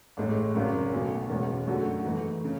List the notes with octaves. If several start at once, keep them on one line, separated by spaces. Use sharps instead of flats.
A1 A2 G#3
G#1 F#2 C#3
B1 B2 A3
E1 E2 B2 G#3 C#4
F#2 D3 A3 D4 F#4
G#2 E3 A3
C#3